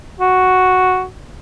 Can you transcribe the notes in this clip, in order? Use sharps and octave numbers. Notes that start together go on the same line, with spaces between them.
F#4